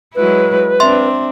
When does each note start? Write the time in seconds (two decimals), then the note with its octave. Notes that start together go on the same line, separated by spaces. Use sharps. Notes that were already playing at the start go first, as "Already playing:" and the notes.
0.15 F#3 G#3 E4 B4
0.80 C4 D4 E5 C6